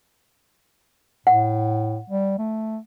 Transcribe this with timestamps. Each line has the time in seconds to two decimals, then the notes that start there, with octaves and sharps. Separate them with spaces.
1.27 A2 F#5
2.10 G3
2.38 A3